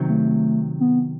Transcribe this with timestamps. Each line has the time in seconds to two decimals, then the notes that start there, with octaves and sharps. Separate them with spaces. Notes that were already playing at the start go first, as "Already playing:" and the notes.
Already playing: C3 D#3 F#3 C4
0.09 A3
0.80 B3